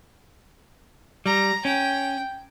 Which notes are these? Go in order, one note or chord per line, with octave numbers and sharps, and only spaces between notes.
G3 A#5
C#4 G5